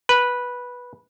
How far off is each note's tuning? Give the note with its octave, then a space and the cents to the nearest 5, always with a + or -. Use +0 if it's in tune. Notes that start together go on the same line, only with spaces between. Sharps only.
B4 -10